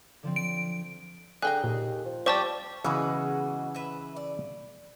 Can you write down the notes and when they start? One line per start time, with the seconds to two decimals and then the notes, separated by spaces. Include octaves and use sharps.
0.23 D3 F3 C4
0.36 D7
1.42 D3 G#4 G5 A#5 F#6
1.64 D#2 A#2
2.05 F3
2.26 G3 G4 C5 D5 A5 C#6
2.84 C#3 E3 G#3 B3 F#4
3.75 B4 E5
4.16 D5